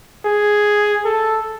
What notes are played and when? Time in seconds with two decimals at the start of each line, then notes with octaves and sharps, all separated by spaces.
0.25 G#4
1.05 A4